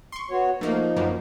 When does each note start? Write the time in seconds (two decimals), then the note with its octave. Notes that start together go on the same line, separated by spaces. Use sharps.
0.12 C6 C#6
0.30 B3 F#4 C#5
0.61 F3 A3 A#3 D#4
0.96 F#2 A#3 B3